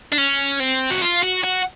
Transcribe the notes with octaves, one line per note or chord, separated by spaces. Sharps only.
D4
C#4
C4
F#4
F4
F#4
F#4